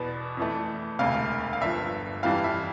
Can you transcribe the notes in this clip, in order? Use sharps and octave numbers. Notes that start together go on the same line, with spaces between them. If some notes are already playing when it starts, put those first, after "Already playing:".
Already playing: E2 B2 B3 D5
F2 E3 A3
E1 D2 C3 F5
F5
G1 G2 F3 E5
F1 F2 E3 G3 F5
E5